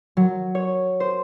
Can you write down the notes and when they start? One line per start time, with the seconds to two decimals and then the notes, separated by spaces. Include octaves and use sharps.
0.17 F#3
0.55 C#5
1.00 C5